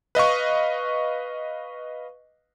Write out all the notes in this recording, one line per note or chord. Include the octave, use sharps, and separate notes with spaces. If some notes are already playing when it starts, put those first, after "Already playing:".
B4 D#5 F5 C#6